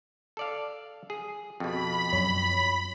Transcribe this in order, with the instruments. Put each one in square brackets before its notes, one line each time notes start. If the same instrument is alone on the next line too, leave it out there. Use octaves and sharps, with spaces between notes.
[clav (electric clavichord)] A4 D5 F5
G#4
[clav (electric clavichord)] F2 B2 [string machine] B5
[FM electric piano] F#2 C#5 B6